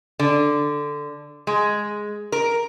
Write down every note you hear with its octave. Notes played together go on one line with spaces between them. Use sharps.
D3
G#3
A#4